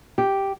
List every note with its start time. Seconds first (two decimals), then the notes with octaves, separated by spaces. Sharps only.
0.18 G4